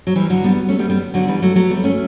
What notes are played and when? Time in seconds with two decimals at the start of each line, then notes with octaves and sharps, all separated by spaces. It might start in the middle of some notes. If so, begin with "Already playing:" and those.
0.07 F#3
0.16 E3 G3
0.30 D3 F#3
0.44 G3 B3
0.69 A3 C#4
0.79 G3 B3
0.90 G3 B3
1.14 D3 F#3
1.28 E3 G3
1.42 F#3 A3
1.56 F#3 A3
1.70 G3 B3
1.84 A3 C#4